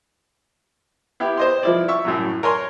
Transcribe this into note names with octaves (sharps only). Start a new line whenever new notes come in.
B3 E4 G4
C5 D#5 C6
F3 E4 D5
E5 C#6 E6
F#2 A2 F#3
A#4 C#5 G#5 C6